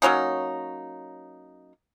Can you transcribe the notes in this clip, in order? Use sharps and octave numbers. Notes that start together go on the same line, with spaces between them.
F#3 A#3 C#4 D#4